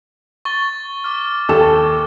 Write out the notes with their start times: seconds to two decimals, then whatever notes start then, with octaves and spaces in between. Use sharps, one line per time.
0.45 C#6 A6 G7
1.04 D6 F6
1.49 D#2 A4 E7